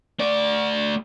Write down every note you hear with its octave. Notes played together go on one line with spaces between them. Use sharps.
A3 D5